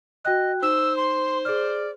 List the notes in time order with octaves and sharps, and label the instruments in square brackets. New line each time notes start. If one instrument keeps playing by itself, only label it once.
[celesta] F#4 G5 F#6 [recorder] D#5
[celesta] D#4 [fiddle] C5 [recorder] E6
[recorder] C6
[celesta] G#4 F6 [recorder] D5